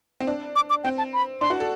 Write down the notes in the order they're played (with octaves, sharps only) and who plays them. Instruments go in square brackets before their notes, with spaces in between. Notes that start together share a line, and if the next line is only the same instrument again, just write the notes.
[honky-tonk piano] C4
D4
[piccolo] D6
D6
[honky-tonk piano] C4 [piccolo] G5
[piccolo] A5
B5
[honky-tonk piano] D4 [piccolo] C6
[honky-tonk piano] F#4
A4